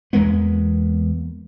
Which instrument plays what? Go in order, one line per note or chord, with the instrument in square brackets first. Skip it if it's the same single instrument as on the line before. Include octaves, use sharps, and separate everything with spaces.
[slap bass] E2 G#3 A#3 B3